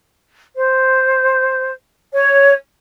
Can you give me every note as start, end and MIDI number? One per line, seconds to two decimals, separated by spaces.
0.56 1.70 72
2.13 2.53 73